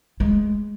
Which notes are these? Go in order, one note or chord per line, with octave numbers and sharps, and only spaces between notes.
G#3